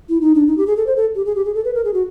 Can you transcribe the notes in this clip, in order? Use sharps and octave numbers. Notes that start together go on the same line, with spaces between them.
E4
D#4
D4
D#4
G4
G#4
A4
C5
A4
G4
G#4
G4
G#4
A4
B4
A#4
G#4
F#4